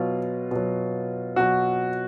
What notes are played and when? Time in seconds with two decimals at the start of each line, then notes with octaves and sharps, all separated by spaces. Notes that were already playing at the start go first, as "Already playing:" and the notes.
Already playing: B2 F#3 F4
0.51 B2 F#3
1.36 B2 F#3 F#4